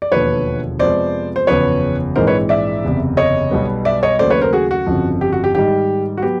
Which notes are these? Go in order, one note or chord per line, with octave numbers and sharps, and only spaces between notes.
D5
E1 D#2 D3 F3 B4 C#5
F2 C3 F3 G#3 B3 C5 D5
C5
F#1 E2 C#3 F3 B4 C#5
A#1 G#2 E3 G#3 C4 A#4 C5
B4 C#5
D5 E5
F#1 E2 C3
C#5 D#5
B1 B2 G3 B3
D5 E5
C#5 D#5
D#2 C#3 F#3 A3 C5 D5
B4 C#5
A#4 C5
F#4 G#4
F#4
G1 F2 C#3 F3
G4
F#4
G4
G#2 D#3 G3 G4
F#4
F#3 B3 G4